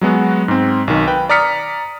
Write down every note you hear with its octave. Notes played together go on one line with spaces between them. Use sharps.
F#3 G#3 B3 F#4
G#2 C4
B1 D#3
B4 G5
D5 A#5 D#6 F6 B6 C#7